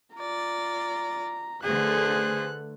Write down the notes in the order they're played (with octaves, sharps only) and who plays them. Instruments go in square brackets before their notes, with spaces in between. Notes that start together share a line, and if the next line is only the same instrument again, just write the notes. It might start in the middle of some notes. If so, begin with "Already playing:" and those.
[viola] F4 D5 [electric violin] A#5
[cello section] D3 A3 [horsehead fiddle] G#4 C5 [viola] A4 B4 [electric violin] F#6